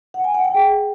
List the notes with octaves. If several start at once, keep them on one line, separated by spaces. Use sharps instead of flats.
F#5
G#5
F#5
G5
G#4